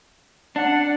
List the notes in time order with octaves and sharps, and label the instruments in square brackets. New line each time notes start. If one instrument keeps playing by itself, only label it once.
[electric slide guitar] D4 [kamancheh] F#5